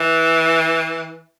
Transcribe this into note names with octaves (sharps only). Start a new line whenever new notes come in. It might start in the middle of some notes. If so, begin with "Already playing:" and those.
Already playing: E3